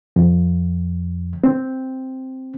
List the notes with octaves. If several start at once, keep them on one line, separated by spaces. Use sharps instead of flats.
F2
C4